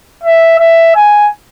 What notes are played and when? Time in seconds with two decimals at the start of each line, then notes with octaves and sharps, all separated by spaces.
0.23 E5
0.59 E5
0.96 G#5